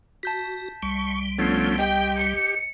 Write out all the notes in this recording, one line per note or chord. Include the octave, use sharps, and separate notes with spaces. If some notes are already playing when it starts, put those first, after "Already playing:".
F#4 A5 G6 B6
C2 G3 C#6
F3 A3 B3 C#4 D4 C7
G4 D#5 G5
C#7